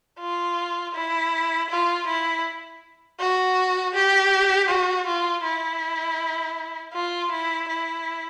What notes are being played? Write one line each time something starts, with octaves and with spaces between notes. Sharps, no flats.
F4
E4
F4
E4
F#4
G4
F#4
F4
E4
F4
E4
E4